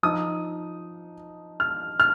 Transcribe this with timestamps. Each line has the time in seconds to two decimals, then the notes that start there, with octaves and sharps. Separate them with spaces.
0.03 F3 D#4 D#6
1.60 F6
2.00 F6